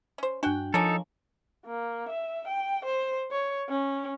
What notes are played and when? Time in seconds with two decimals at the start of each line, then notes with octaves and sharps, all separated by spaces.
0.18 C#4 C5
0.43 G2 D4 F#4 G5 F#6
0.74 F3 G#3 A#3 D#4 A4 C#5 G#5 A5
1.66 A#3
2.09 E5
2.48 G5
2.85 C5
3.32 C#5
3.69 C#4